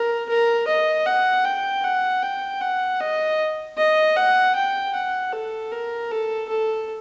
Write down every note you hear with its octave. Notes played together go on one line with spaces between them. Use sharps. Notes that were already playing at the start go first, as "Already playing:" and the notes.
Already playing: A#4
A#4
D#5
F#5
G5
F#5
G5
F#5
D#5
D#5
F#5
G5
F#5
A4
A#4
A4
A4